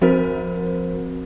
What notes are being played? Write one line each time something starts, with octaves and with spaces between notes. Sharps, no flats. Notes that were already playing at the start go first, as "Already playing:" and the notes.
F3 C4 F#4 A#4 C5